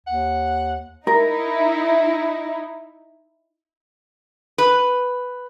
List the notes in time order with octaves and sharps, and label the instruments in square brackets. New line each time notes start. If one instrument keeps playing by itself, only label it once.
[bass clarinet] D#2 [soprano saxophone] F#5
[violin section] D#4 E4 [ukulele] A#4
[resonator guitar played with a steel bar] B4